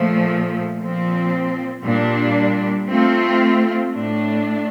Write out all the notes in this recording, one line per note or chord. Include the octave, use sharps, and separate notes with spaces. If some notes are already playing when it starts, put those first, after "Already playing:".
Already playing: A#2 F3 A3
A#2 F3 C4
A#2 G3 D4
A3 C4 F4
A2 A3 D4